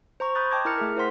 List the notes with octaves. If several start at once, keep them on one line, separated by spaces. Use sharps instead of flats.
C5 A#5 C#6
B5 C6 D#6 F#6 G6 A6
D#5 G5 A5 D6 G#6 A#6
E4 A#4 A#5 F6 F#6 C#7
A3 G#4 A#4
E4 A#4 C5 F#5 C6 B6